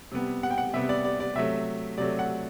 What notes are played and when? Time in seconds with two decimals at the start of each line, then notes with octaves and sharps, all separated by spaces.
0.12 C3 G3 B3
0.43 F#5
0.50 G5
0.58 F#5
0.74 C3 G3 B3 E5
0.89 D5
1.04 D5
1.20 D5
1.35 C3 F#3 A3 E5
1.98 C3 F#3 A3 D5
2.19 F#5